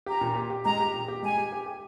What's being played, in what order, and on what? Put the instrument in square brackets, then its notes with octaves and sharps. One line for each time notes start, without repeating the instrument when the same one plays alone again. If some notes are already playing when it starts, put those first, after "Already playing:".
[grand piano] G4 [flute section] A#5
[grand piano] A#2
G4
G4
[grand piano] G#3 [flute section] A#5
[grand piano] G4
A#2
G4
[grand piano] G#3 [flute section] G#5
[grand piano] G4
G4
G4